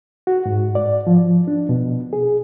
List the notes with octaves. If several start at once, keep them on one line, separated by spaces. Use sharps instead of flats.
F#4
G#2
D5
F3
D4
B2
G#4